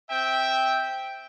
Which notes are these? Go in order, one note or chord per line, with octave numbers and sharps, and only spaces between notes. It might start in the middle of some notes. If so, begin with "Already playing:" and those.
C4 E5 G5